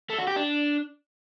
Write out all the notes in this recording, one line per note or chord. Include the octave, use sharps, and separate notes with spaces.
A3
F#4
G4
D4